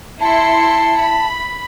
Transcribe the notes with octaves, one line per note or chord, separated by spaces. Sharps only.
E4 A5 C6 C#7
B5